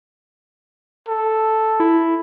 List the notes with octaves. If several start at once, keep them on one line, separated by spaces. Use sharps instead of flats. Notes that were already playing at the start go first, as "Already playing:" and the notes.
A4
E4